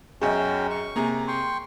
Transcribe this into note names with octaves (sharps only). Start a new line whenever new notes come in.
B1 F#2 C#4 F#4 G#4 D#5 G5
C#6
C3 A#3 G#4 A#5
G5 C6 C#6